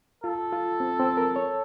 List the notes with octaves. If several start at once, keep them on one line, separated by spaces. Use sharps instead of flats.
F4 A4
F4
C4
C4
A#4
C#5